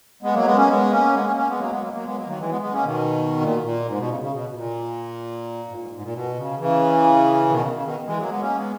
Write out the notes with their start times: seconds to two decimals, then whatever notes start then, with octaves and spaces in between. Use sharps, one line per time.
0.23 G#3 B3
0.33 F#3 A#3
0.45 G#3 B3
0.56 A#3 C#4
0.68 G#3 B3
0.91 A#3 C#4
1.13 G#3 B3
1.25 A#3 C#4
1.36 A#3 C#4
1.48 G#3 B3
1.59 F#3 A#3
1.70 G#3 B3
1.82 F#3 A#3
1.93 F#3 A#3
2.05 G#3 B3
2.16 F#3 A#3
2.27 D#3 F#3
2.38 E3 G#3
2.50 G#3 B3
2.61 G#3 B3
2.73 A#3 C#4
2.84 B2 D#3
3.41 A#2
3.63 A#2
3.87 G#2
3.98 B2
4.09 C#3
4.20 C#3
4.32 B2
4.50 B2
4.54 A#2
5.68 G#2
5.79 G#2
5.91 G#2
6.02 A#2
6.14 B2
6.37 C#3
6.59 C#3 E3
7.49 B2 D#3
7.61 C#3
7.72 C#3
7.84 B2 D#3
8.06 E3 G#3
8.18 F#3 A#3
8.29 G#3 B3
8.40 A#3 C#4
8.56 G#3 B3